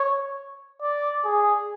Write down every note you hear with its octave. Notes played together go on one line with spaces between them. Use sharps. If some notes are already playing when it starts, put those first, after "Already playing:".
Already playing: C#5
D5
G#4